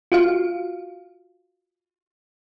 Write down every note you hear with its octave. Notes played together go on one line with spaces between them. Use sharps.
F4 F#4 F5